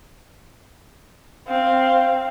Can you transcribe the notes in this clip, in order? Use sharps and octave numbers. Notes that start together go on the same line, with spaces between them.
C4 F5